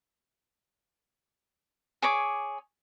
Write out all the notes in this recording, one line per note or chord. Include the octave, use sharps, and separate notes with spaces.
G#4 C#5 D6